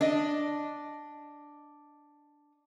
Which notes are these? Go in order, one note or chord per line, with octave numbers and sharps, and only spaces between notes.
D4 D#5